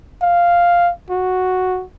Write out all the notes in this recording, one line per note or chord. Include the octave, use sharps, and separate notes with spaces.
F5
F#4